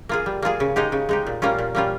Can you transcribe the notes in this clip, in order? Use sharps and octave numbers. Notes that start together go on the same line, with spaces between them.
A#3 F4 G#4
G3
A#3 F4 G#4
C#3
G#3 D#4 G4
C#3
G#3 D#4 G4
A#2
G3 A#3 C#4 F4
A#2
G3 A#3 C#4 F4